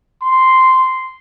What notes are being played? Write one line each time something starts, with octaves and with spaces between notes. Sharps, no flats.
C6